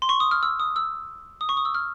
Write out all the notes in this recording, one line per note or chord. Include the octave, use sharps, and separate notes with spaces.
C6
C#6
D#6
F6
E6
D#6
E6
D#6
C#6
D#6
E6
F6